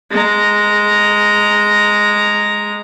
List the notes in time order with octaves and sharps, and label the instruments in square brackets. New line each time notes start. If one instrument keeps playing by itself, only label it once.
[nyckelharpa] G#3 A#5